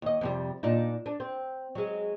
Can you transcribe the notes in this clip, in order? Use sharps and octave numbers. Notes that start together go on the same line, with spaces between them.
D#2 D#5
F2 C3 G3
A#2 D4 D#4
D4
C4
F#3 G#3